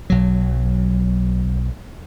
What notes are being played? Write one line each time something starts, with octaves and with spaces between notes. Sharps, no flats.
B1 F#3